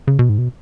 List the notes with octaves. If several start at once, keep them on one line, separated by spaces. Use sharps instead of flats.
C#3
B2
G#2
B2